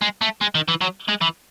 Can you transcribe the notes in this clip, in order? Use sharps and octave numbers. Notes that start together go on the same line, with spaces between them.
G#3
A3
G#3
D#3
E3
F#3
G#3
E3